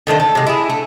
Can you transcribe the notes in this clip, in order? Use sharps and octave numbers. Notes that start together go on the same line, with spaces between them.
D3 D#3 A3 C5
A4
C3 G#3
E4 G#4
A3